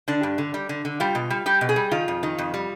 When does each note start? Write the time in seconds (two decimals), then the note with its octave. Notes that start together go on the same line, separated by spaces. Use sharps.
0.08 D3 D4
0.23 G2
0.38 D3
0.54 G3
0.69 D3
0.85 D3
1.00 G3 F4
1.15 B2
1.30 G3
1.46 G3 G4
1.61 B2
1.69 G#4
1.76 G3
1.91 D#3 F4
2.08 F2
2.23 D#3
2.38 F2
2.54 G3